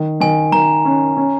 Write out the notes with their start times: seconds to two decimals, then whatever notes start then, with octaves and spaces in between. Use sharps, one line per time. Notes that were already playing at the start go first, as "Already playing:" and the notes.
Already playing: D#3
0.20 D#3 G#5
0.52 D#3 A#5
0.85 C#4
1.17 C#4